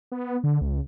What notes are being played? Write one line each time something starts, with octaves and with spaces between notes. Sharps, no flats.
B3
D3
C#2